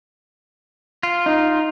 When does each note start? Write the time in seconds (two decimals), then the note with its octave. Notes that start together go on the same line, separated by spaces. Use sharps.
1.03 F4
1.26 D#4